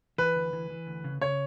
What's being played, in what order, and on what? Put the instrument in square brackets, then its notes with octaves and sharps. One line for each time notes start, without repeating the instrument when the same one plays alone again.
[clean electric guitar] E3 [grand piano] B4
[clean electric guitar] D2
E3
E3
D2
C#3
[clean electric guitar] C#3 [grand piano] C#5